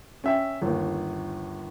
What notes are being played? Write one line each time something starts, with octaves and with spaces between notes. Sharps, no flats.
C#4 E5 G5
G1 D#2